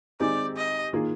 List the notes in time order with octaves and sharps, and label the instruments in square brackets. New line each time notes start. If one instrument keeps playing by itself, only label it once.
[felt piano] D#3 G#3 C4 D#4 G4 [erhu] D5
[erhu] D#5
[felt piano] D#3 A#3 F4 G#4